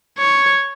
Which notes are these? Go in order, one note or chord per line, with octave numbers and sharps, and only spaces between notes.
C#5